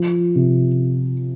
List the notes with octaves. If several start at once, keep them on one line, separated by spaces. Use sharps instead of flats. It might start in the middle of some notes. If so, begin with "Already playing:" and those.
Already playing: F3
C3